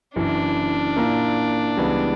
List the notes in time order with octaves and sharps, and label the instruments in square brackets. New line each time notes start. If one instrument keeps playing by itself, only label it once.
[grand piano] F#1 F#2 E3 [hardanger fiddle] D4
[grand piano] A#2 A#3 E4 A#4
C#2 C#3 E3 G3 B3